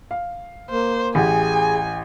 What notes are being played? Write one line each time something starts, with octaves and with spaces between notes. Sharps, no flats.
F5
A#3 C5
A1 G4 G#4 G#5